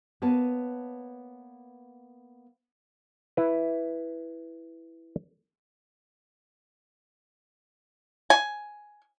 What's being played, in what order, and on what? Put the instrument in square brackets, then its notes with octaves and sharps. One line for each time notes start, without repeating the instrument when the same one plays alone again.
[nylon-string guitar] A#3 B3 B4 C#5 A5
[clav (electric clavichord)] E4 B4
[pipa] G#5